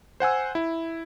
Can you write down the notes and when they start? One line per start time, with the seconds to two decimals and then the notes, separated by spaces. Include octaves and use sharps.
0.20 C5 F#5 G#5 E6
0.55 E4